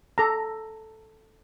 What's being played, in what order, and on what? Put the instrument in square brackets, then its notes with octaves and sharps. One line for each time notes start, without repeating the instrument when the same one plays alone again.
[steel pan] A4 A#5